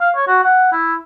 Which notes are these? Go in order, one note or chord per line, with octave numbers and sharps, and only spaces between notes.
F5
C#5
F#4
F#5
E4